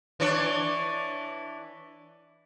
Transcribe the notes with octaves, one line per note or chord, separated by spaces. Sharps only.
E3 D4 C#5